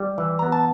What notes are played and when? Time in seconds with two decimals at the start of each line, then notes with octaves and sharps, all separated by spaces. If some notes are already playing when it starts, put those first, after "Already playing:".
Already playing: G3
0.18 E3
0.39 B3 A#5
0.52 A5